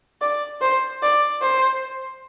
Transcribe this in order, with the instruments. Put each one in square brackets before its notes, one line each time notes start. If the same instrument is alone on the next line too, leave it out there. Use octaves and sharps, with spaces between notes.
[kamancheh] D5
C5
D5
C5